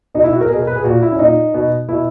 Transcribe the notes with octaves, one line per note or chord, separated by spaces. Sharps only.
B2 D#4
E4
F#4
A#4
B2 G#4
A#4
B4
G#4
A#2 F#4
E4
C#4
A#2 D#4
B2
B2 E4